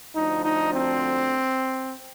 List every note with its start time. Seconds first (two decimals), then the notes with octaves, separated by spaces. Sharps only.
0.15 D2 D3 F3 D#4
0.44 D#4
0.73 C4